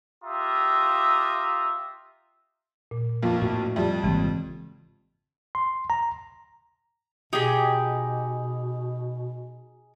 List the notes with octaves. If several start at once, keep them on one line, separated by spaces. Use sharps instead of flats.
F4 G4 E5 A#5 D#6
A#2
A#1 F2 A#3
A2 F#4
F2 G3 G4 E5
G#1 C#3 E3 G#3 A#3 C4
C6
A#5
B2 D#4 G4 G#4